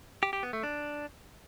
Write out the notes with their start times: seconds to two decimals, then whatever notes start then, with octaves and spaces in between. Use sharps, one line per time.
0.23 G4
0.33 G4
0.43 B3
0.53 A3
0.63 D4